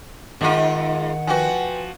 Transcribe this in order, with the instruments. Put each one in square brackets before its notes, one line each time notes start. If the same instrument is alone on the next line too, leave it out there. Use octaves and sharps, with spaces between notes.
[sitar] G#2 F4 [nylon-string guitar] D#3 D#4 [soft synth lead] F#5
[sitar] F3 F#4 [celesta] B4 G5 G#5